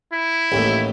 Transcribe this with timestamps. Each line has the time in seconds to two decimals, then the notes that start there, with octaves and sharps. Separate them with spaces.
0.13 E4
0.52 A1 D#2 A2